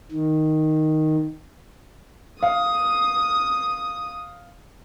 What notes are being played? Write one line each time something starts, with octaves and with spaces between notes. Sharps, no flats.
D#3
F5 D#6